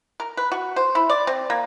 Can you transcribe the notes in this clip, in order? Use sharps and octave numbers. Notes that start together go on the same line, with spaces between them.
A#4
B4
F#4
C5
E4
D5
C4
A#3